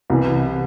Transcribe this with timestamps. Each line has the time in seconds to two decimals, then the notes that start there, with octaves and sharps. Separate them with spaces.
0.10 C2 C3 E3